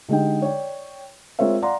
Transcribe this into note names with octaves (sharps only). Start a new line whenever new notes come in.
D3 G#3 D#4 G4 D#5 G5
C#5 D5 G5
G#3 C4 F4 A#4 C#5 E5
D5 F5 F#5 A#5 C6